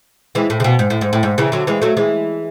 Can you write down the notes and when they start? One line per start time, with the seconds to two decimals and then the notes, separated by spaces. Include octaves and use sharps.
0.35 E3 G#3
0.50 A2
0.60 C#3
0.64 B2
0.79 G#2
0.90 A2
1.01 G#2
1.13 A2
1.23 G#2
1.38 C#3 E3
1.52 D3 F#3
1.67 E3 G#3
1.82 F#3 A3
1.97 E3 G#3